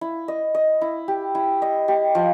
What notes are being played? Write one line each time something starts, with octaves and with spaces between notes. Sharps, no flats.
E4
D#5
D#5
E4
G4
E4
D#5
G4
F3